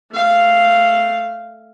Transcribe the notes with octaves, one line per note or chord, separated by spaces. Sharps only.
A3 F5